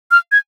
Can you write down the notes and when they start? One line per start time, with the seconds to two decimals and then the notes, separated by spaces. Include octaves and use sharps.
0.11 F6
0.32 G#6